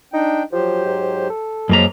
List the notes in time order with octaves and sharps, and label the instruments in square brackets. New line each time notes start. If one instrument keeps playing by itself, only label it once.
[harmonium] D4 G5 [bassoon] D#4
[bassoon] F3 [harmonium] F#3 G4 C5
[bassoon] G#2
A4
[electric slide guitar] F#2 A#3 A#5 [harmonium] F3 F#3 G#3